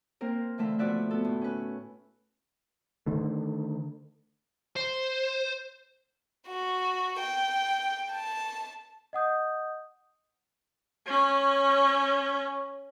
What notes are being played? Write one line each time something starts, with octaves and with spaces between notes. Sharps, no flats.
A#3 C4 A#4
D3 E3 A3 E5 F5
B2 F3 B3 D5 E5 F#6
B3 A4
A2
C#4 B4
D3 D#3 A3
C5
F#4
G5
A5
D#5 F#5 D#6 G6
C#4 C#5